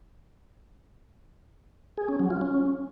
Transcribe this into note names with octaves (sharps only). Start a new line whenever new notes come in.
G#4
C#4
F#3
F4
C#4